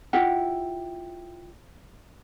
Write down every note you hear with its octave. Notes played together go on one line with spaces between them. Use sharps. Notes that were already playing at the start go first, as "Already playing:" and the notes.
E4 F4 G4 F#5